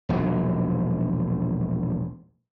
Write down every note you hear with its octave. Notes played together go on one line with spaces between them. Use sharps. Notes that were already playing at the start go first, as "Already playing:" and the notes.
E1 A#1 D#2 F#3